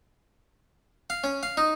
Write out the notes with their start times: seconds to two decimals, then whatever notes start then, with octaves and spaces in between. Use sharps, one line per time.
1.10 F5
1.24 C#4
1.43 F5
1.57 D#4